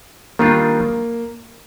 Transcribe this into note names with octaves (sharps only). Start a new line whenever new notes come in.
D#3 G3 A#3 D4 F4